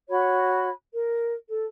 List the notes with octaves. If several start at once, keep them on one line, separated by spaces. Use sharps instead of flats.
F#4 C#5 B5
A#4
A4